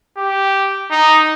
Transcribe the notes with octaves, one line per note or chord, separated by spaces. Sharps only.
G4
D#4